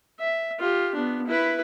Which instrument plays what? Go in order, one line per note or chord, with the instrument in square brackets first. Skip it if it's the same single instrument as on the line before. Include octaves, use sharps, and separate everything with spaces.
[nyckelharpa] E5
F4 G4
B3 D4
E4 B4